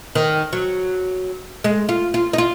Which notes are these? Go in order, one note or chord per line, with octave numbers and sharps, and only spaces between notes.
D#3
F#3
G#3
F4
F4
D#4
F4